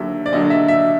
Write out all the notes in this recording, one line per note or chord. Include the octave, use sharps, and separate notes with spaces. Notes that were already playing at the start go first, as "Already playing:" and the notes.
Already playing: D#2 D3 F#3 E5
D5
D#2 D3 F#3 D#5
E5
E5